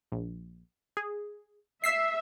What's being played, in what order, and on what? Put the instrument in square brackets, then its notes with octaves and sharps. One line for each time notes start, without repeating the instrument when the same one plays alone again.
[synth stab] A#1
G#4
[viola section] E5 [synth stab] E6 B6 C7